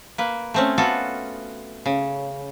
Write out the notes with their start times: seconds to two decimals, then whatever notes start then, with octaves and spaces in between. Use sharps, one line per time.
0.18 A#3 B4
0.54 A3 C4 C#4
0.78 B3 F4 F#4 A4
1.86 C#3